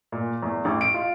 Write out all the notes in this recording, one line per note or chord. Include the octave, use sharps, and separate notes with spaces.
A#2
E2
A1
D7
F4